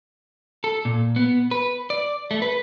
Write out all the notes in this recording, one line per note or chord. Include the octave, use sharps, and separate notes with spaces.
A4
A#2
B3
B4
D5
A3
B4